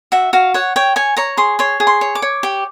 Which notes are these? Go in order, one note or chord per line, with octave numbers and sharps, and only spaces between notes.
F#4 E5
F#4 F5
C#5 F#5
C#5 G5
C#5 G#5
C#5 A#5
G#4 C6
C#5 C6
G#4
C6
C#5
D6
C#5
G4